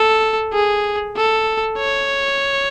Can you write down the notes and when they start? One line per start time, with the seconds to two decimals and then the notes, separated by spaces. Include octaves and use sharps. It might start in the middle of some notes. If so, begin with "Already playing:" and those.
Already playing: A4
0.53 G#4
1.16 A4
1.78 C#5